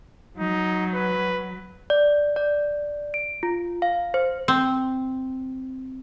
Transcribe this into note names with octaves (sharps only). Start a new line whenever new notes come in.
F#3 D#4
B4
D5
D5
D7
F4
F5
C5
C4